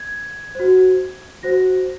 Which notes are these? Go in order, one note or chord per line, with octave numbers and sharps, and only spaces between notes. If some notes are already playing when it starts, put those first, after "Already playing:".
Already playing: G#6
F#4 C5
F#4 C5 A#6